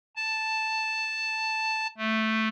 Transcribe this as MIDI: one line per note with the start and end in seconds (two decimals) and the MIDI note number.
0.16 1.87 81
1.98 2.48 57